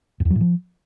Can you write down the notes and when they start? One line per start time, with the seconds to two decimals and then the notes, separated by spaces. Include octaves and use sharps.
0.20 F2
0.25 E2
0.30 F#3
0.35 A2
0.41 F3